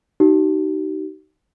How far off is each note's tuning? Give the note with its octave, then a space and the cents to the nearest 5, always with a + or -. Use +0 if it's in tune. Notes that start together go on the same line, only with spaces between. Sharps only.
D#4 +0 G4 -45